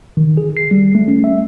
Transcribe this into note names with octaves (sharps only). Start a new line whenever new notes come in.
D#3
G#4
C7
G3
A3
C#4
E5